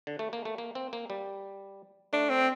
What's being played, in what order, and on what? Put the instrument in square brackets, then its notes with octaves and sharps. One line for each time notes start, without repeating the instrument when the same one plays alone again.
[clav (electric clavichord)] D3
A3
A#3
A3
A#3
C4
A#3
G3
[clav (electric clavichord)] A3 [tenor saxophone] D4
[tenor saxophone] C4